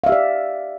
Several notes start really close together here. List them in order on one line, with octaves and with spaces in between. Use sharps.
F5 E5 G4 D5